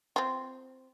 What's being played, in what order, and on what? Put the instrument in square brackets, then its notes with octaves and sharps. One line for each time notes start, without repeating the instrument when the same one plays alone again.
[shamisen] C4 F4